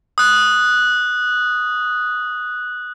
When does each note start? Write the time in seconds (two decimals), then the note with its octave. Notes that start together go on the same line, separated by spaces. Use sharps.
0.18 D#6 F#6